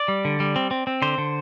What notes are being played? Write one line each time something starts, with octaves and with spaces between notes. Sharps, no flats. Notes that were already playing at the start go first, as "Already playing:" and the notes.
Already playing: D5
G3
D3
G3
C4
C4
C4
D3 C5
D3